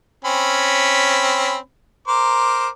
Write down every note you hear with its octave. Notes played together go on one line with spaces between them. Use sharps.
C4 C#4 B5
A#4 C5 D6